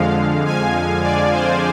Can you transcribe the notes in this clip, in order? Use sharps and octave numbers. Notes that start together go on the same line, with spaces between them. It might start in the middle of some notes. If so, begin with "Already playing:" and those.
Already playing: F2 D3 F3 G#3 F5
G#5
D5
C5